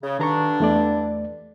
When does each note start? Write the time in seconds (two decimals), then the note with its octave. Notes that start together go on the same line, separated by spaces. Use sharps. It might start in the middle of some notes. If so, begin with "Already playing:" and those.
0.02 C#3
0.19 G2 D3 D#3 D4 A#5 C#6
0.60 E2 A3 D5